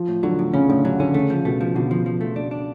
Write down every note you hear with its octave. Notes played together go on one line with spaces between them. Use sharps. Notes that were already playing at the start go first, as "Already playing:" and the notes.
Already playing: F3
A2
D3 F#3
A2
C#3 C#4
A2 D3
D3 F#3
D3 C#4
C#3 A3
F3
B2 A3
F3
B2 D3
F3
F3
A3
D4
D4